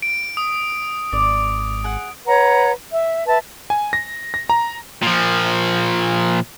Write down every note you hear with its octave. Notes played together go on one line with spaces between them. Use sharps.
D7
D#6
G#1 D5
G#4 F#5
B4 C#5 F#5 A#5
E5
B4 E5 A5
G#5
A#6
A#6
A#5
A#2 F3